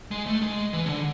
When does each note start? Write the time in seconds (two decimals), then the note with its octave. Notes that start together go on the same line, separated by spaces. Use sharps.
0.11 G#3
0.26 A3
0.42 G#3
0.73 E3
0.86 C#3
0.89 D3